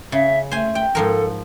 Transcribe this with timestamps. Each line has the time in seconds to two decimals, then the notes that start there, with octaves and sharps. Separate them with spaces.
0.12 C#3 E5
0.51 A3 C5 G#5
0.75 G5
0.95 G#2 F3 A4 A#4